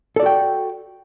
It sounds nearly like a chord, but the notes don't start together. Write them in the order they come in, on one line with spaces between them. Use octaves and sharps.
A4 D5 F#4 G5